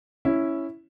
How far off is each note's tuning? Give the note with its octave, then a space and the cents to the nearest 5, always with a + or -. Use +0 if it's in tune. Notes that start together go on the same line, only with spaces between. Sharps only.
C#4 +0 E4 +0